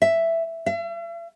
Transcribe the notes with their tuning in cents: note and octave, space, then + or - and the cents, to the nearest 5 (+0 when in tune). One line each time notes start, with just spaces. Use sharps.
E5 +5
E5 +45